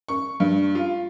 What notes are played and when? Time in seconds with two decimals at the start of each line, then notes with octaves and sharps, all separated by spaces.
0.09 C#6
0.40 G2
0.75 F4